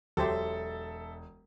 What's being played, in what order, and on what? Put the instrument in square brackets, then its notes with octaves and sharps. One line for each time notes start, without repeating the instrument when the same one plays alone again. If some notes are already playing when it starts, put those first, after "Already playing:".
[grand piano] E1 [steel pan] F#3 G4 C5 [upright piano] A4 E5